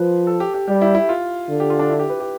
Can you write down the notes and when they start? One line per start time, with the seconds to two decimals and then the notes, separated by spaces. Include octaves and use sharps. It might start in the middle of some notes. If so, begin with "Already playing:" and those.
Already playing: F3 B4 C5
0.27 A4
0.40 G4
0.54 G4
0.68 G3 G4
0.81 E4
0.95 E4
1.09 F4
1.49 D3
1.60 G4
1.70 F4
1.79 D4
1.90 E4
1.99 G4
2.10 B4
2.20 G4